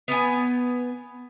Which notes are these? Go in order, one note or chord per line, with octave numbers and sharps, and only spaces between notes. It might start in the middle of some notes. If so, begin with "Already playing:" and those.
B3 G#5